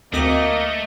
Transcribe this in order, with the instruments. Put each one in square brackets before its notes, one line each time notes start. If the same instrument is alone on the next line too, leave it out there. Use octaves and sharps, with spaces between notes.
[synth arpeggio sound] D2 C4 D6 [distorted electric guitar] A3 [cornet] A#3 [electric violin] D#5